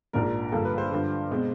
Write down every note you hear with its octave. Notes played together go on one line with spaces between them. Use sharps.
A#1 G#2 F3 A#3 D4 A#4
G2 D3 F3 A#3 A4
B4
C5
G2 D3 F3
B2 G#3 C4